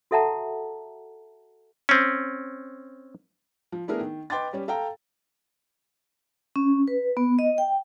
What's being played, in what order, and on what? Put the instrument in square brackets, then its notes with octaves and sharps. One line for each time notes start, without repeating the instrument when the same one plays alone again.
[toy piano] F#4 A4 E5 F#5 A5 A#5
[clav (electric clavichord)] C4 C#4
[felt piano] F3
A3 B3 D4 E4 G#4 A#4
D#3
B4 D#5 G5 C6 D6 A6
G3 C#4 G4
A4 F5 G5 A#5
[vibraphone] C#4
B4
B3
D#5
G5